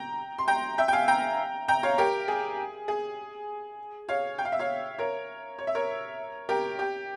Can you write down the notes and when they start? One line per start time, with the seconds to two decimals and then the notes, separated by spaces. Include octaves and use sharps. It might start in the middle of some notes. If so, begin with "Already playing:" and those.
Already playing: G5 A#5
0.38 C6
0.48 G5 A#5
0.78 E5 G5
0.88 G5
0.93 F5 G#5
1.08 G5 A#5
1.68 G5 A#5
1.83 C#5 F5
1.98 G4 A#4
2.28 G#4
2.88 G#4
4.09 C#5 F5
4.38 G5
4.45 F5
4.52 E5
4.59 C#5 F5
4.99 A#4 C#5
5.59 C#5
5.67 E5
5.75 A#4 C#5
6.49 G4 A#4
6.79 G4